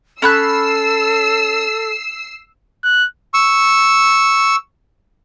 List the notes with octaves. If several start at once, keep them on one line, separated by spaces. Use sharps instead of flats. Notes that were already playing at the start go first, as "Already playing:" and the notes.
C#4 A4 B5 E6 F#6 C7
F#6
C#6 E6